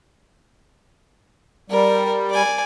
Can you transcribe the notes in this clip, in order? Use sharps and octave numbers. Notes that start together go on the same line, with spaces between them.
G3 A#4
D5 G#5